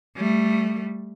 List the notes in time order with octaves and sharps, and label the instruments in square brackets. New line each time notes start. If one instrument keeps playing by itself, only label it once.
[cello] G3 A3